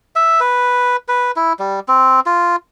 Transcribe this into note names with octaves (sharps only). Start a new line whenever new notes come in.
E5
B4
B4
E4
G3
C4
F4